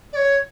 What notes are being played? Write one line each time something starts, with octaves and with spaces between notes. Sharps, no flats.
D5
C#5